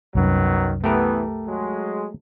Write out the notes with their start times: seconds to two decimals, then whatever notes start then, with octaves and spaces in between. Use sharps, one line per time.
0.15 C2 F#2 D#3 F#3 B3
0.84 E3 A3 B3 G4 A#4
1.47 F#3 G#3